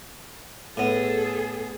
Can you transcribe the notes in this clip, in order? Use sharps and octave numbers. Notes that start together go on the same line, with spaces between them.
A2 B3 G#4 A4